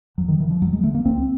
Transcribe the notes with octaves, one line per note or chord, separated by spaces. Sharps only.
F2 F#3
D#3
D3 E3
F3
F2 F#3
G#3
D3 A3
A#3
C#2 C4